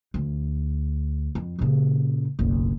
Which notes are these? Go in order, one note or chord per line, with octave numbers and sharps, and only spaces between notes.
D2
F2
A#2 C#3
F#1 B1